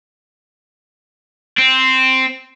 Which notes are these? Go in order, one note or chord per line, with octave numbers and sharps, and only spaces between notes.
C4